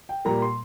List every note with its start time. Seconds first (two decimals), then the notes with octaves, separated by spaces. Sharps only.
0.09 G5
0.25 A#2 G3 A#3 A#5
0.42 C6